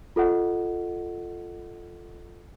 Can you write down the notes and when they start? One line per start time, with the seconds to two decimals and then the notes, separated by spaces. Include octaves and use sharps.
0.16 F4 A4 D#5 F#5